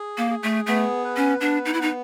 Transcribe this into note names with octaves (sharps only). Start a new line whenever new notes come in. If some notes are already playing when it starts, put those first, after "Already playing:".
Already playing: G#4
A#3
G#4
A3
A3 B3
B4
C#4
B3 D4
D#4
E4
B3 D#4